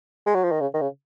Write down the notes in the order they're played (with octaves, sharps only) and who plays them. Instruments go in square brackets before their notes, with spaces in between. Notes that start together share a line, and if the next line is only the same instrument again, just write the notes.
[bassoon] G#3
F#3
F3
D#3
C#3
D#3
C#3